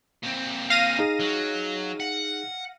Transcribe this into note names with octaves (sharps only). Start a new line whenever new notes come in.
A#2 C4
F5 A#6 D#7
D#4 G#4
F#3
F#5